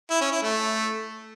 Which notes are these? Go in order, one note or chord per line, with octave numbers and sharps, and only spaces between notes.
E4
C#4
E4
A3